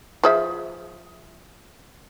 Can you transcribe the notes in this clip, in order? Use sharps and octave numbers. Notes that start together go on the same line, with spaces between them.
F3 G#4 E5